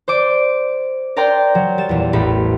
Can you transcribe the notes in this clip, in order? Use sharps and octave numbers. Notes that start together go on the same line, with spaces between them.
C5 D5 D6
A#4 D5 G5 A#5 C6 G6
F#3
G3 A6 E7
E2 A#2
A1 A2 B5